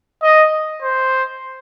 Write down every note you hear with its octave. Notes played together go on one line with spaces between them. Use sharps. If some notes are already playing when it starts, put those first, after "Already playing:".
D#5
C5